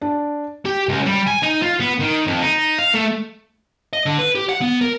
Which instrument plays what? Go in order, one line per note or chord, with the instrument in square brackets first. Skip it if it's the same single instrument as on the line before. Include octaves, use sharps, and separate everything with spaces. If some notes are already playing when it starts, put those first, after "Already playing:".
[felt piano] D4
[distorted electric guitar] G4
C#2
G3
G#5
D#4
F4
B3
D#3
F2
D#4
F5
A3
[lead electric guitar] D#5
D3
B4
G4
F#5
B3
A#4